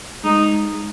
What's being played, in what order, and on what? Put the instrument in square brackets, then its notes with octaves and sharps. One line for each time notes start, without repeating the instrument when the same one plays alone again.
[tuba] G#3 [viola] D#4